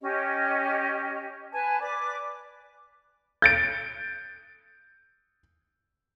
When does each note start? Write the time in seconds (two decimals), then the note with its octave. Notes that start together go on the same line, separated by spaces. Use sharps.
0.01 C#4 G4 D#5
1.53 B4 G#5 A5
1.80 B4 D5 D6
3.42 G6 A6 D7